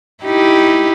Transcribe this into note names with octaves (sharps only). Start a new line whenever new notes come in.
D#4 E4 G4